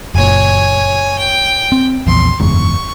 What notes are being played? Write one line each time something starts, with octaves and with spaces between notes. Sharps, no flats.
F#1 A#2 C#5 G#5
G5
C4
A#1 E2 C6
F#1 E2 G#2 C#6